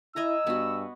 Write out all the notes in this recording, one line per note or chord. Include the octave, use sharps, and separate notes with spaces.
E4 D#5 G#5 A#5 E6
G2 B3 F#4